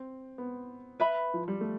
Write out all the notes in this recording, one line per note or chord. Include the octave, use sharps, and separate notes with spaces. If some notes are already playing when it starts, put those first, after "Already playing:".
Already playing: C4
B3
B4 E5 B5
F3
G3
A3